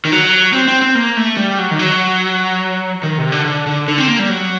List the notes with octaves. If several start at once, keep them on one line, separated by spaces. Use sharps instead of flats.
D#3
F#3
C4
C4
C4
A#3
A3
G3
F#3
D#3
F#3
D#3
C3
D3
D3
D3
D3
C4
A#3
G3
F#3